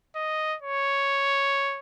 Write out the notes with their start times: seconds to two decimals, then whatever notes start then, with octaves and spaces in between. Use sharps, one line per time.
0.16 D#5
0.62 C#5